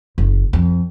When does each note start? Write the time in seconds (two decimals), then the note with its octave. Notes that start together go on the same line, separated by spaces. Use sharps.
0.18 F#1
0.53 F2